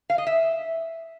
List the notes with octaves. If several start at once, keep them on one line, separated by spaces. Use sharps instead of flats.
F5
D#5
E5